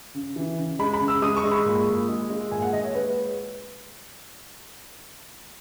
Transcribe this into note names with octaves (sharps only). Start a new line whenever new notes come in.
C#3
E3
C#3
G#3 B5
B5
C#3
E6
G#3 D#6
C#6
G#3
B5
A#2
A#2
G#3
G#3
A#2 G#5
F#5
A#2 D#5
C#5
G#3 B4